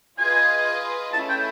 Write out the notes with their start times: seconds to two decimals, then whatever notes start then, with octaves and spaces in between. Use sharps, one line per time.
0.18 F4 G#4 B4 D#5 G#5
1.13 A3 C#4 E4 A5
1.29 G5